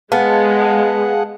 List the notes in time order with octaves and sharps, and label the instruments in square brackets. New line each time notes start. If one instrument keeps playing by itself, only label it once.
[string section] G#3 [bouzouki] B3 [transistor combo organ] G#4 F#5 [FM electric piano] F5 A5